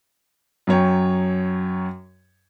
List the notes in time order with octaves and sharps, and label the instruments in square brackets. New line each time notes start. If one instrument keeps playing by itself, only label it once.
[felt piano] F#2 F#3 C#5 G5